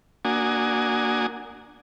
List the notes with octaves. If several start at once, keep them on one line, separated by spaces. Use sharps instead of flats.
A#3 D4 F#4 G#5 D#6